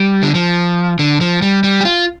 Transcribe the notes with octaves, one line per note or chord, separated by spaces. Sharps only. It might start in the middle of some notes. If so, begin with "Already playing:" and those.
Already playing: G3
D3
F3
D3
F3
G3
G3
G4
F4